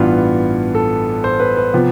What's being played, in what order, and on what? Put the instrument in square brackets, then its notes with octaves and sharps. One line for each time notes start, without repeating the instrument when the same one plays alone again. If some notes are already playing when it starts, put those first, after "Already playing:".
Already playing: [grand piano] A1 G2 E3 B3 F4
A4
C5
B4
B4
C3 F3 B3